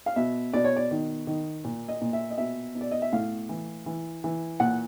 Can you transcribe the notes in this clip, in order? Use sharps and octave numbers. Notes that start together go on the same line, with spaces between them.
F5
B2 E5
B2 D5
C#5
D5
D#3
D#3
A#2
D#5
A#2
E5
D#5
B2 E5
B2
D5
D#5
E5
A2 F5
E3
E3
E3
A#2 F#5